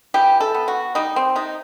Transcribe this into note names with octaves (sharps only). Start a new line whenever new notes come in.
E3 G4
A4
B3
F#4
G3 D#4
C4
C3 D#4